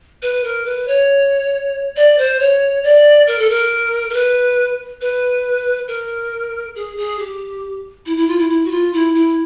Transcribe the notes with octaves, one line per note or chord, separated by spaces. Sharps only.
B4
A#4
B4
C#5
D5
C5
C#5
D5
A#4
A4
A#4
A#4
B4
B4
A#4
G#4
G#4
G4
E4
E4
F4
E4
E4
F#4
F4
E4
E4